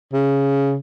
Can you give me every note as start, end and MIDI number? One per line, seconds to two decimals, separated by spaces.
0.13 0.76 49